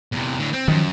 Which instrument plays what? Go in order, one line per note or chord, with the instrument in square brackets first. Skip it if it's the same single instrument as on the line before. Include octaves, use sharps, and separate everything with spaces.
[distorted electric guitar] E2 C3
A2 D3
C4
[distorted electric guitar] F#2 [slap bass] D#3 F3